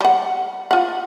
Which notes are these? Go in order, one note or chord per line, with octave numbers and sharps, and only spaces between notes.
G3 F#5
F4 F#5